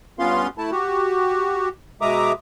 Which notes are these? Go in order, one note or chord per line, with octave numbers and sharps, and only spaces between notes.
G2 B3 C#4 F4 F5 C6
A3 E4 A5
F#4 G4
B2 G#3 E5 A#5 D6 D#6